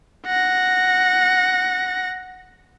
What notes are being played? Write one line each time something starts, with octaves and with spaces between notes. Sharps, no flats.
F#5 A#6